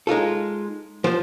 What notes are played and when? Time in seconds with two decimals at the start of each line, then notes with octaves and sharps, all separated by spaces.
0.07 G#3 D#4 F4 A4
1.04 F3 C5